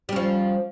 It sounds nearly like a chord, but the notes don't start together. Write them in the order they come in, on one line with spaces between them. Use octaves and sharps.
G3 C#4 F3